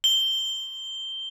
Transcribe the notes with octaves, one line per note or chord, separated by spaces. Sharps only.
G7